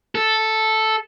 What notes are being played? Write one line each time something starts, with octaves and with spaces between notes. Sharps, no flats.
A4